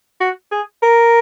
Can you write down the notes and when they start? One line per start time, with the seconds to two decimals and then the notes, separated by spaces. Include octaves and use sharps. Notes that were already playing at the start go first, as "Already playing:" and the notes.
0.20 F#4
0.52 G#4
0.83 A#4